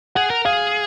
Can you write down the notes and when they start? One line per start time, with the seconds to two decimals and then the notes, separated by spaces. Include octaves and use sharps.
0.15 G#4 F#5
0.30 A#4
0.45 G#4 F5